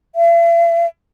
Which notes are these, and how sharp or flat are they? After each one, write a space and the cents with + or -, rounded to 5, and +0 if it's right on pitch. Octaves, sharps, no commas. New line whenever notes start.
E5 +45